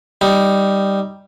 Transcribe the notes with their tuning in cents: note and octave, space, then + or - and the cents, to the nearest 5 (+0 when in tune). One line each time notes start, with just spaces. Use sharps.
G3 +0 D#4 +0